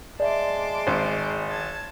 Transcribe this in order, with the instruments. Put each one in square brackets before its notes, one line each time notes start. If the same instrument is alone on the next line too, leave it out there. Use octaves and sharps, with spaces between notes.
[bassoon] G#3 [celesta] D5 E5 [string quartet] A5 C6 D6
[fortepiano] G#1
[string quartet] A5 G#6